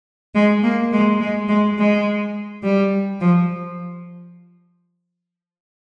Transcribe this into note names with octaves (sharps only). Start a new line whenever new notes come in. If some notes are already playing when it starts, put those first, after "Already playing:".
G#3
A#3
G#3
G#3
G#3
G#3
G3
F3